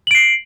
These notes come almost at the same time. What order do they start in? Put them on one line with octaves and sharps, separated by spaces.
F#7 D7 C7